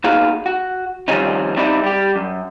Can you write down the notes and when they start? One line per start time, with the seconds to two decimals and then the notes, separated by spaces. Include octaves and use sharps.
0.04 A#3 B3 D#4 F#4 G#4 F5
0.46 F#4
1.08 D#3 F3 G3 C4 C#4 D#4
1.56 G3 C4 D#4 E4 D5
1.84 G3 G4
2.16 F#2